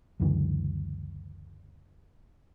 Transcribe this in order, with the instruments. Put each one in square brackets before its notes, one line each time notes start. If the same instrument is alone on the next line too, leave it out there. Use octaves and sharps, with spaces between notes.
[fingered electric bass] C#2 F#2 D3 E3